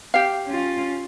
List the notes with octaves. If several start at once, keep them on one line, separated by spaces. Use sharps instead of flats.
G4 F5
C#4 F4